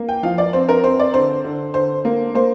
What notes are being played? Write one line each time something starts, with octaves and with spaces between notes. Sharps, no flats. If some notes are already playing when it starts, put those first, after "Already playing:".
Already playing: A#3
G5
F3 F5
D5
C4 C5
A#4
C4 C5
D5
D3 C5
D3
D3 C5
A#3
A#3 C5